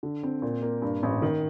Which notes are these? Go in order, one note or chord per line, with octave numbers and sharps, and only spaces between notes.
D3
C4
A#2
A#3
G2
A1
D#3